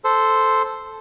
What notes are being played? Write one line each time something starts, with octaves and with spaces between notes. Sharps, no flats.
A4 C5